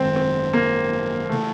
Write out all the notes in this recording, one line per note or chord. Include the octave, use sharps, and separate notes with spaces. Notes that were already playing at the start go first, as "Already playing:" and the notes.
Already playing: G#1 F#2 D#3 G#3 C4
C4
A#3
C#3 E3 A3